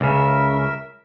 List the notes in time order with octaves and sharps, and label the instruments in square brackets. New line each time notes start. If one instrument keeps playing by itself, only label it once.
[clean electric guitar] C#2 C#3 [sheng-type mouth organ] A#4 E5